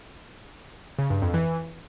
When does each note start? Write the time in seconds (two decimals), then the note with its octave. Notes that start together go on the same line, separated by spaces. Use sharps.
0.99 C#3
1.10 G2
1.22 F2
1.34 E3